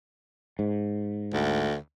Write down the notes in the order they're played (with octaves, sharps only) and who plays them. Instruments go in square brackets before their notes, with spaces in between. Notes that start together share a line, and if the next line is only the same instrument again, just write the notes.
[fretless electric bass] G#2
[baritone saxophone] D2